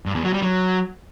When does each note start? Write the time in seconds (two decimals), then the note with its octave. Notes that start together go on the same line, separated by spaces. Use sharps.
0.06 G2
0.15 E2
0.24 F#3
0.33 G3
0.42 F#3